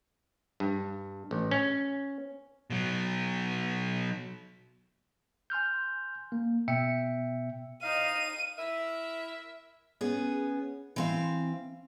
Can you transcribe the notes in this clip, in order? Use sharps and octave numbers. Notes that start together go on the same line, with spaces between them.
G2
A1
C#4
B2 F#3
G#5 C6 F6 G6
A#3
B2 B3 E5 G5 C#7
D#4 D#5 F5 D#7
E4 A#4 E5
B3 C#4 G#4
E3 C4 F5